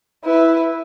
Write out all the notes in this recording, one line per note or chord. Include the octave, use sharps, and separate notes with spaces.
E4 B4